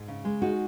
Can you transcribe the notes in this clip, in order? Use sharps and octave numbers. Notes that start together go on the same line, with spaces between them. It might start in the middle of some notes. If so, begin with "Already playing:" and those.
Already playing: G#2
C#3
G#3
D#4 F#4